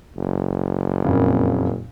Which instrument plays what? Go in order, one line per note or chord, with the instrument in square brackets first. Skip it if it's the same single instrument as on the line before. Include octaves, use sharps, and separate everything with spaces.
[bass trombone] F#1
[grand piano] F2 A#2 C#3